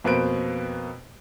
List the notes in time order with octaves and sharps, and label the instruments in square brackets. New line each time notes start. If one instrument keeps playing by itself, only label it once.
[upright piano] F2 B2 A#3 B4 C5 D7